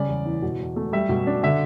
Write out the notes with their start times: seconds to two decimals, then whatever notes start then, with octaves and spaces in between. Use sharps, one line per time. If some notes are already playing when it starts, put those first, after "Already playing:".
Already playing: C#3 G3 D5
0.09 E2
0.26 E3
0.42 B2
0.60 E2
0.76 A3
0.93 G3 E5
1.09 B2
1.27 D4
1.43 D3 E5